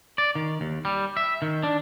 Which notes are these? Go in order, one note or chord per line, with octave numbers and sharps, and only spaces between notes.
D5
D#3
D#2
G3
E5
D#3
D4